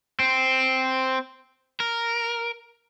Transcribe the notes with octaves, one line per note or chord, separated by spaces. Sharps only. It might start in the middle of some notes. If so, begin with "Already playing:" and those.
C4
A#4